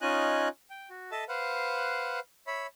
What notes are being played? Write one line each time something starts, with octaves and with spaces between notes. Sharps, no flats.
C#4 D#4 F4 D#5 G#5 F#6
G5
F#4
A4 D#5 E5 A5
B4 C5 F5 F#5
C#5 E5 B5